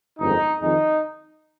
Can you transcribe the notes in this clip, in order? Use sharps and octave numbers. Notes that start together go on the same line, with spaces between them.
G1 F2 D#3 G#3 D#4
F2 D#3 G#3 D#4